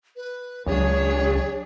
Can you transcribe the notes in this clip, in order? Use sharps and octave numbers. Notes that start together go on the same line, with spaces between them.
B4
C#2 F#3 D4 G#4 C#5